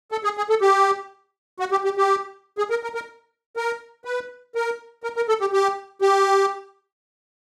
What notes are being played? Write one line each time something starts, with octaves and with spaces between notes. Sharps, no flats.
A4
G#4
G#4
A4
G4
F#4
G4
G4
G4
G#4
A#4
A#4
A#4
A#4
B4
A#4
A#4
A#4
A4
G4
G4
G4